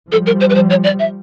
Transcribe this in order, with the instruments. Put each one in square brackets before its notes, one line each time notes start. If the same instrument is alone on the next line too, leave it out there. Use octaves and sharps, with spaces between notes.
[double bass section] F3 G3 [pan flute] A4
[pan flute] A#4
C5
B4
C5
C#5
D5
E5